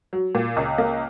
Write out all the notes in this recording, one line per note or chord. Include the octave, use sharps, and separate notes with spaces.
F#3
A#2
C#2
A#3